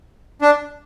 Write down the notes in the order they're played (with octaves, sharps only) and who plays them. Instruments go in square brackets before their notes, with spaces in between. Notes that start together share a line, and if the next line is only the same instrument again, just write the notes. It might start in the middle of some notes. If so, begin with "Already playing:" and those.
[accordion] D4